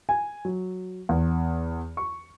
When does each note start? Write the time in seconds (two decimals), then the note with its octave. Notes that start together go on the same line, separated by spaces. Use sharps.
0.09 G#5
0.45 F#3
1.09 E2
1.97 C#6